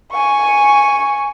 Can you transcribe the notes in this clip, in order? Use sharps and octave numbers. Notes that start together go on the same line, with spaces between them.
G#5 C#6